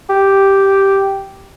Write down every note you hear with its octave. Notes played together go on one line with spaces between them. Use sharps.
G4